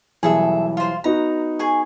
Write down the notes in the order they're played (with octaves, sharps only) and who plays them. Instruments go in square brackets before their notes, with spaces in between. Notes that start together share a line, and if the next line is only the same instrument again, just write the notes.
[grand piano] B1 E3 G3 [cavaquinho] G#4 A4 E5
[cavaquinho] F4 C5
[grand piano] B3 D#4 F#4 [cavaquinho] A#5
[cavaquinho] G#4 G#5 C#6